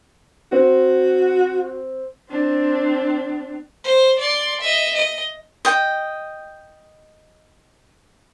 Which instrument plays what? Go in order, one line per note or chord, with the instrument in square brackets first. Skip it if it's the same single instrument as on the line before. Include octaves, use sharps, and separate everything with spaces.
[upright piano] C4 [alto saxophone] F#4
[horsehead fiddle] C4 D4
[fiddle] C5
D5 C6
D#5 E5
D#5
[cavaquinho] D#5 G5